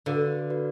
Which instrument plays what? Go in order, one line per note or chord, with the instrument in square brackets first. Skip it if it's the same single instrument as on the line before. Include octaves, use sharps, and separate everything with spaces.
[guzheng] D3 [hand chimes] F#4 B4 D5 F5
[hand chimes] F#4 B4 D5 F5